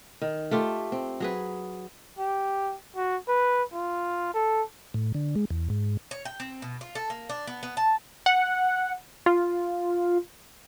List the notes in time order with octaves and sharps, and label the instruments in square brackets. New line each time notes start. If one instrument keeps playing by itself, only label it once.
[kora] D#3
A3 F4 G4
C4
F#3 G#4 B4
[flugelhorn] G4
F#4
B4
F4
A4
[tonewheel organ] A2
D3
G#3
E2
G#2
[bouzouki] C#5
G5
C4
B2
F4
A4
A#3
D4
B3
B3
A5
[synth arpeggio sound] F#5
F4